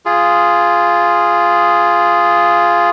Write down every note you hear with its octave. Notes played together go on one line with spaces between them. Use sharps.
F4 G#4